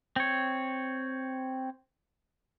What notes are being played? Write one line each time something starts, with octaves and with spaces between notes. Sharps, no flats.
C4 C#5